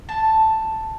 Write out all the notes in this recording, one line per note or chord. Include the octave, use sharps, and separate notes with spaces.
A5